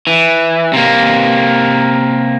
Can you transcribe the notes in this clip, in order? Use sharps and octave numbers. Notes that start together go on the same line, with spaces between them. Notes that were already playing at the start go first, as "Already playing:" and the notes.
E3
C3 A#3